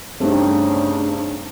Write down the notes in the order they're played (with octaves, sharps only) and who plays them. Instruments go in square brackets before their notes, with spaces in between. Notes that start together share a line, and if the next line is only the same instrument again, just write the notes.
[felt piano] G2 A3 [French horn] C#3 [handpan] C4 D#4 [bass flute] D4